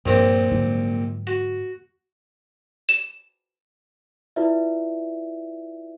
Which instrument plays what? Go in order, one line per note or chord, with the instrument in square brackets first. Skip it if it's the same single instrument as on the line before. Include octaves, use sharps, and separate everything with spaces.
[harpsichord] A#1 A#2 C4 [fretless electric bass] G2
[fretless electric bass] G#2 D3 F#3
[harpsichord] F#4
[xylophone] E7
[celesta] E4 F4 B4 D5 E5